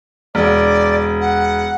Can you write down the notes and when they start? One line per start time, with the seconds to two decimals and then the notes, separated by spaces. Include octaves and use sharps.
0.35 E1 D5
1.21 F#5